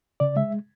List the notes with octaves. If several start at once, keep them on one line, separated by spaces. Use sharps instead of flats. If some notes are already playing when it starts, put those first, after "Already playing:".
C#3 D5
G#3 E5